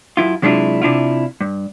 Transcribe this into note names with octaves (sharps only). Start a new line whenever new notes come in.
F#2 E4 F4
C3 F#3 G#3 D4 E4 F4
C3 D4 E4 F4
G2